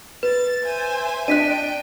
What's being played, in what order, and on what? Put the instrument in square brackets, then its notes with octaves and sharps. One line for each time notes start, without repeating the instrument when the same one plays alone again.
[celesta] B4 [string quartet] A6
[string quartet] C5 E5 G#5
[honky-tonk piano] D4 D#5 [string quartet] G5 A5 [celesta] F#6 B6 D#7